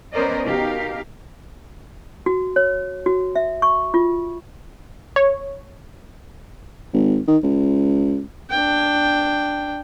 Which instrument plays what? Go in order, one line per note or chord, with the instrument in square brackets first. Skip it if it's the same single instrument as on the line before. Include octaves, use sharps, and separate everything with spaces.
[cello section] B3 C#4 A#4 C5 D5 D#5
B2 D#4 G4 A#4 F5
[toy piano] F#4
C#5
F#4
E5
C#6
F4
[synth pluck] C#5
[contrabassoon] G#1
D#3
C#2
[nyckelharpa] D4 G5